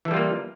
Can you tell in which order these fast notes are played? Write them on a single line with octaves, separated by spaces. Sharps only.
E3 A4 G3 F4 A#3